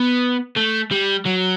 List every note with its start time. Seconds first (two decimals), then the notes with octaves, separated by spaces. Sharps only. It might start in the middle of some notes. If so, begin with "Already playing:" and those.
Already playing: B3
0.57 A3
0.91 G3
1.25 F#3